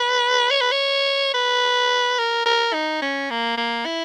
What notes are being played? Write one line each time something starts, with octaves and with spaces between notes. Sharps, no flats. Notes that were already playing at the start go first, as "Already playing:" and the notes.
Already playing: B4
C#5
B4
C#5
B4
A#4
A#4
D#4
C#4
A#3
A#3
E4